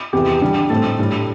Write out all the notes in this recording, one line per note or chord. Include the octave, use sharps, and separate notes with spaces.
E2 C3 E3 G4
D3 G3 D4
A2 A3 C4 A4
A2 G3 D4